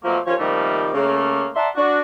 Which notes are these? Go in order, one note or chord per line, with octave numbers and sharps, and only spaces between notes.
B2 F3 F#3 A3 A#3
D#2 F3 C#4 C#5
C3 D#3 F3 G3 A3 A#3
C#3 A3 A#3
D5 E5 F#5 A5 A#5 C6
D4 F#4